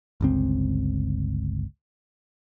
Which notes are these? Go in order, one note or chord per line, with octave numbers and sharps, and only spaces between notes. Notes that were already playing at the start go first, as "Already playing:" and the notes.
G1 C#2 C4